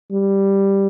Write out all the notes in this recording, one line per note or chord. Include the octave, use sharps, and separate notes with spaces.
G3